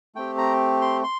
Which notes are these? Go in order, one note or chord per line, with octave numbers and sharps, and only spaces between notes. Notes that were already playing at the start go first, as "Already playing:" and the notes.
A3 C4 G4 G5
A#5
C6
C6